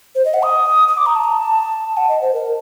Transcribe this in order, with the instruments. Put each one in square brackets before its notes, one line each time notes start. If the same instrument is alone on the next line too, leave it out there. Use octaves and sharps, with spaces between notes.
[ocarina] C5
D#5
F#5
D#6
D#6
D6
A#5
A5
A#5
A5
F#5
D#5
C5
A#4